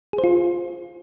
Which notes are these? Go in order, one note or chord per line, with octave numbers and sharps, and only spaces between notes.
G#4
C5
F4